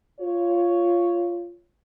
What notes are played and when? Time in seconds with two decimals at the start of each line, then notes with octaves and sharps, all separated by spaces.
0.20 F4 C#5